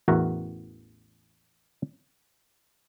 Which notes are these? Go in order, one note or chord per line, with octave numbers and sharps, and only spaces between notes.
A1 E2 F#4 A#4 E5 F#5